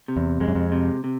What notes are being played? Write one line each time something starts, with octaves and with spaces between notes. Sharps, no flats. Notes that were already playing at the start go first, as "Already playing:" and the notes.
C3
E2
F2 G#3
F#2
F2
C3
C3